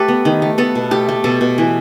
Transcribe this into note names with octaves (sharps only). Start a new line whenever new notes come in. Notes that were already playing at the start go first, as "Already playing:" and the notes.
Already playing: A3 G4 A4 B4
B3
D#3
A3
B3 A4
B2
A3 G4
A3
B2 A4
B2
E3